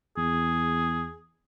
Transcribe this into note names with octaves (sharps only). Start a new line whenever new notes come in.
E2 G#4